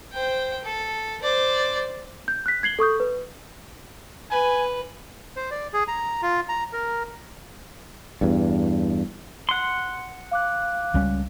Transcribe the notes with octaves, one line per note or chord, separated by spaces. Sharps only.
C5 G5
A4
C5 D5
G6
F#6 B6
G#6 C7 F#7 G7
A4 C#6 D#6 G6
B4
B4 G#5
C5
D5
G#4
A#5
F4
A#5
A#4
E2 G2
F#5 C6
F5 D6 F#6
C#2 G3 C#4